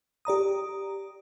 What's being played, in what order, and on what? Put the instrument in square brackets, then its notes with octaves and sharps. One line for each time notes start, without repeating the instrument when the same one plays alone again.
[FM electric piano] G4 D5 A#5 D#6